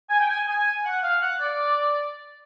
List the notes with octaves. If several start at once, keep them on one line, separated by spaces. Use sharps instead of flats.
G#5
G5
G#5
G#5
F#5
F5
F#5
D5